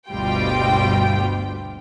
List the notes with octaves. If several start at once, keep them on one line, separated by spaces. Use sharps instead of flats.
G1 D2 B2 G3 F4 G5